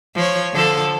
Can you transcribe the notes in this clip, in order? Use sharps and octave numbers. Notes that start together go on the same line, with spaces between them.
F3 C#5
D3 F3 A4